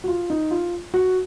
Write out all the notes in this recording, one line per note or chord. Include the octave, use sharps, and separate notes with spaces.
F#4
F4
D#4
F4
F#4